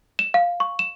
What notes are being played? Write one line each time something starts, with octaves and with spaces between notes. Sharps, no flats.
E7
F5
C#6
E7